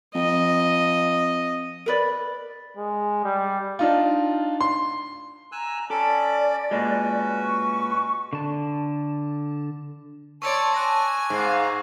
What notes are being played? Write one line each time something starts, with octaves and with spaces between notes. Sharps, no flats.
F2 D#5
A#4 B4 D5
G#3
G3
D4 D#4 F4
C6
G#5 A#5 E6 F#6
C#4 A4 D5 B5 D6
A#2 G#3 C#4 F#4 B4
C#6
D3 A5
C#5 D5 A5 C6 C#6 E6 G#6
G#5 D6 F#6 A#6
G#2 F5